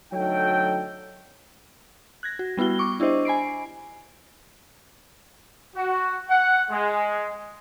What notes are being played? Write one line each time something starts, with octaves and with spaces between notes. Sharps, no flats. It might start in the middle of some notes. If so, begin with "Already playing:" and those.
D2 F#3 D#4 A4 G5
F#6 G#6 A#6
F#4
G3 B3 E4 F#4 G7
C#6 D6
D4 E4 G4 C5 D#5
G#5 B5 C7 D7
F#4
F#5
G#3